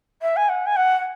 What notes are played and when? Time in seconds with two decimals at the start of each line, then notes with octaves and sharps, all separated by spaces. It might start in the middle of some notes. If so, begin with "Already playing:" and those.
0.22 E5
0.37 G#5
0.49 F#5
0.66 G#5
0.76 F#5